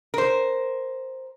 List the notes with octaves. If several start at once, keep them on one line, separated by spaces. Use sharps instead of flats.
A#4 C5